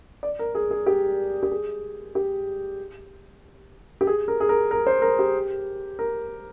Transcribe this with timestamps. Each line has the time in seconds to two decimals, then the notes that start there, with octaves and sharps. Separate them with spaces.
0.23 D5
0.39 A#4
0.55 G#4
0.71 G#4
0.86 G4
1.43 G4
1.51 G#4
2.15 G4
4.01 G4
4.07 G#4
4.28 A#4
4.40 G#4
4.49 A#4
4.71 A#4
4.87 C5
5.02 A#4
5.19 G4
5.99 A#4